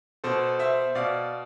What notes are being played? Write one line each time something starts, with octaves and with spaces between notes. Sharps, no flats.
B2 A4 C5
C5 E5
B2 D5 F5